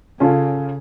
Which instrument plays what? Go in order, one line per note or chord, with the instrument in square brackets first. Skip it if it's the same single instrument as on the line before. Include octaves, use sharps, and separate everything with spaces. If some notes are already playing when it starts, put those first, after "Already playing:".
[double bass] C#3 [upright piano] C#4 F4 A4